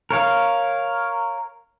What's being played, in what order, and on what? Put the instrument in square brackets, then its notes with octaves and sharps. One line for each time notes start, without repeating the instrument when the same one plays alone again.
[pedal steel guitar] A#4 C#5 F5